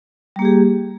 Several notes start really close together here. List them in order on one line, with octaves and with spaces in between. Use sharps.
G3 A#3 G4 G#4